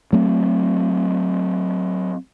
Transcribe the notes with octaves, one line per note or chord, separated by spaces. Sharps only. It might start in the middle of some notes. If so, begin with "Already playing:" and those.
F#3 A3 C4